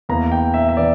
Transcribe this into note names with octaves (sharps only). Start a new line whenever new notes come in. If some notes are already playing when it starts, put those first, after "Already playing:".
E2 E3 A#3 A#5
G5
E5
E5
E3 D5